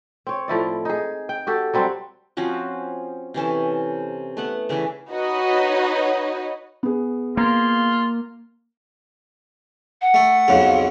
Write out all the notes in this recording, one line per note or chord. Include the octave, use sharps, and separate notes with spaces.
C4 C#5
A2 F3 E4 D5
D#4 G#4
G5
F#4 G4 A4
F#3 G3 C4 D4
F3 C4 C#4 F#4
C3 E3 C#4 A4
A3 B3 F#5
C#3 E3 D4 E5
D#4 F#4 B4 C#5 D#5 B5
B3 G#4
A#3 F4
F#5
A3
B1 F2 C#3